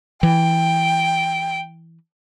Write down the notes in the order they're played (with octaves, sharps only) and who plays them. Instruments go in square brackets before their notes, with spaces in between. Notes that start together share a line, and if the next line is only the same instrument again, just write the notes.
[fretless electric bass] E3 [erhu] G5